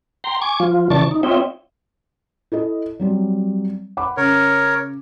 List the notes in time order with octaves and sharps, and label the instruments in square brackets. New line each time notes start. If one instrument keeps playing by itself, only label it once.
[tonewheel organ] G5 A#5 C6
G#5 C#6 D6
F3 F4
C#3 E3 D5 A5 C#6
D#4
C4 F4 C#5 D#5 E5 G5
[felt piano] E4 A4 D#5
F#3 G3 C4
F#5 B5 D6
[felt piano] C#3 [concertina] A#4 C#5